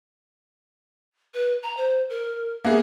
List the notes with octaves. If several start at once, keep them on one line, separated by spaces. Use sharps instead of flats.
B4
A#5
C5
A#4
A#3 B3 G#4 E5